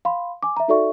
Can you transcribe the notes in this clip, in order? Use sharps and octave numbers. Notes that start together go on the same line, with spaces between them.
F5 B5 C6
G#5 D6
E5 A#5
D#4 F#4 A4 D5 E5 C#6